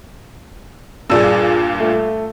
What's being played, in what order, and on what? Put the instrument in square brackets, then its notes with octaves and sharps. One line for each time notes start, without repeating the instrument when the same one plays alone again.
[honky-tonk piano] G2 A#2 [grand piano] G#4 D5 E6
[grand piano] A3